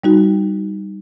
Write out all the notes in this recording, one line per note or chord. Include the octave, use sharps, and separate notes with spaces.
G3 D#4 F#4